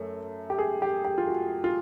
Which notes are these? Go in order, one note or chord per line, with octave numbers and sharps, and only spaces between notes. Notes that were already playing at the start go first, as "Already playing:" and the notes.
Already playing: F#2 A3
G4
G#4
G4
G4
F4
F#4
F4